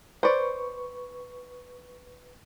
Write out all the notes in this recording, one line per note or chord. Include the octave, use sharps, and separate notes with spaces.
B4 C5 D5 C#6